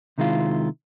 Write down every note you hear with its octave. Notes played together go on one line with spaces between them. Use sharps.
C3 D#3 G#3 E4 F4